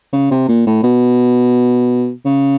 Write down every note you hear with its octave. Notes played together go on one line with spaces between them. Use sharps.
C#3
C3
A#2
A2
B2
C#3